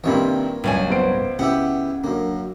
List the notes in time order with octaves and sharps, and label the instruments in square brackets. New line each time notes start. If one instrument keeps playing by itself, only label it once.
[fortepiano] G2 C3 D#3 [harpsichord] A#3 F4 C#5
[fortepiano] C#2 [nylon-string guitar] G2 F#3 G#5
[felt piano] B3 C5 D7
[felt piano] C#3 [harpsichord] B3 E4 G4 [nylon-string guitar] F#5
[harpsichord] F#2 A#3 [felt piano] D3